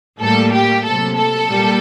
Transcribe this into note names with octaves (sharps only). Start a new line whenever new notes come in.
A2 G3 A#3 A4
G4
C3 F#3 A#3 A4
A4
A#2 G3 A#3